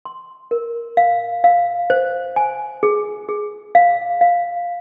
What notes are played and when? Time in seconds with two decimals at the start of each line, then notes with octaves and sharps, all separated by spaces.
0.05 C6
0.51 A#4
0.97 F5
1.44 F5
1.90 C5
2.36 G#5
2.83 G#4
3.29 G#4
3.75 F5
4.21 F5